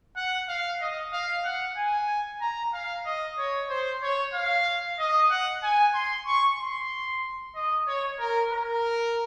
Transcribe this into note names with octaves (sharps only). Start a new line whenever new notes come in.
F#5
F5
D#5
F5
F#5
G#5
A#5
F5
D#5
C#5
C5
C#5
F5
D#5
F#5
G#5
C6
C#6
C6
D#5
C#5
A#4
A#4